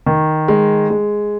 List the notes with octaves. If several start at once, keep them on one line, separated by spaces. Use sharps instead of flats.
D#3
G#3
G#3